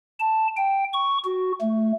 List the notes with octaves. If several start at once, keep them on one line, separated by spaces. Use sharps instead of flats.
A5
G5
C#6
F#4
A3